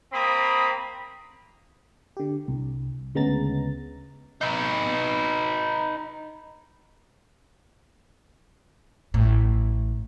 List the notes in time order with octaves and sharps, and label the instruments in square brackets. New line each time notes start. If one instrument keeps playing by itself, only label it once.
[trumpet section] A#3 C4 B5 D#6
[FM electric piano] D3 G4
C2
D2 C#3 G#3 B3 A#5 A6
[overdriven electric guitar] D#4 B4
[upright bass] A1 A2